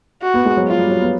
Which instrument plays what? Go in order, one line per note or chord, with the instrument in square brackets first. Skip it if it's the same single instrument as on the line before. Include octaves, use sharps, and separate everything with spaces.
[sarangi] F#4
[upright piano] B3
G#3
F#3
[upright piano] F3 [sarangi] F4
[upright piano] G3
F#3
B3